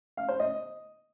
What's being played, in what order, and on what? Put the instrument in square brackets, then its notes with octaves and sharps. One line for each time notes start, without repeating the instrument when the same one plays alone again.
[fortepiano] F5
C5
D#5